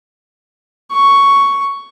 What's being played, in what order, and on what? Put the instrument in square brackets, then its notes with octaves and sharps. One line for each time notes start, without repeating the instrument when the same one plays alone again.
[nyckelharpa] C#6